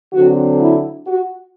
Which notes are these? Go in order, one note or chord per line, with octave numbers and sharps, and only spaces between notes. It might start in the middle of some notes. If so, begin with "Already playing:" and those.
D3 F#3 C4 F#4
E4
F#4